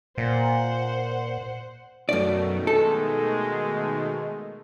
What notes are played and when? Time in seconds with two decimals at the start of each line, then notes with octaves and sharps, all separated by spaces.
0.18 A#2 C5 F#5
2.09 F#2 B2 D#3 A3 D5
2.67 G#3 A4